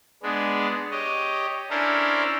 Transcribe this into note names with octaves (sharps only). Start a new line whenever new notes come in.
G#3 B3 D4
G4 C#5 D#5
C#4 D4 E4 A4 A#4 C5